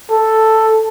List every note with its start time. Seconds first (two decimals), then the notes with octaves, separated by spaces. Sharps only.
0.11 A4